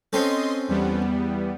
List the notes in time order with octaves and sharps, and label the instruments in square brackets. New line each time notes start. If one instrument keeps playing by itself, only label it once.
[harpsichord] C4 C#4 A4 [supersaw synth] D#5 C6
[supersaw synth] E2 G3 B3